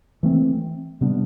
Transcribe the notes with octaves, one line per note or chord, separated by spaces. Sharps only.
E3 A3 C4
C3 G3 B3 D4